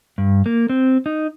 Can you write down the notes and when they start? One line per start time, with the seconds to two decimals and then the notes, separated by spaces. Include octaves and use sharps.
0.18 G2
0.46 A#3
0.69 C4
1.06 D#4